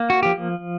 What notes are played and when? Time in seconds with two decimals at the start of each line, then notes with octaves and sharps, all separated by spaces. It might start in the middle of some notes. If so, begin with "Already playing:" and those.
Already playing: A#3
0.10 F#4
0.23 F3 G4